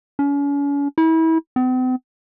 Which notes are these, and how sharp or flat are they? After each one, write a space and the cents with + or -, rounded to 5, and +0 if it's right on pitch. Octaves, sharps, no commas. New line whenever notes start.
C#4 +40
E4 -30
C4 -45